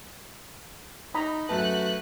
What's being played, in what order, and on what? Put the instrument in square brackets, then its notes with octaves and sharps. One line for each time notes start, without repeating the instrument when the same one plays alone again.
[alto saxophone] D#4 [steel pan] A#5 B5
[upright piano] F#2 A3 A5 [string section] F#4 F#6 [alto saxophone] B4